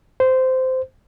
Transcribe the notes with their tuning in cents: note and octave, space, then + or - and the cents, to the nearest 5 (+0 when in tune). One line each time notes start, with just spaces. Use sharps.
C5 -15